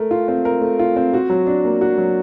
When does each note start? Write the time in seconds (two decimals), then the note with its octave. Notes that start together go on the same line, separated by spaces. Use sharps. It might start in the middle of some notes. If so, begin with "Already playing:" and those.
Already playing: A3 A#4
0.11 F4
0.28 C4
0.45 A#4
0.61 A3
0.79 F4
0.96 C4
1.14 F#4
1.30 F#3
1.47 D4
1.65 A#3
1.81 F#4
1.98 F#3